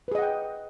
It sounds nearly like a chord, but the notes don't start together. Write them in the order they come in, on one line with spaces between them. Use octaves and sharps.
B4 G#4 D#5 F#5 G5